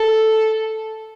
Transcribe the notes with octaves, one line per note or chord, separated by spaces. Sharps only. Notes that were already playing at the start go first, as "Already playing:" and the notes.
Already playing: A4